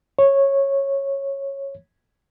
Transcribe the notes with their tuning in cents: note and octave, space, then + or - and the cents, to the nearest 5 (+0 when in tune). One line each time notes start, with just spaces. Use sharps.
C#5 -10